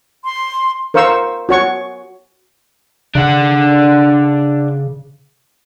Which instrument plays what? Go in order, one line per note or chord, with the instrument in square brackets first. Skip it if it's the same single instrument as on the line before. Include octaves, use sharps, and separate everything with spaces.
[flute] C6
[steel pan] A#4 C5 F5 C#6 E6
F#4 C#5 C#6
[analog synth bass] C#3 [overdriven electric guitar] D4 F#5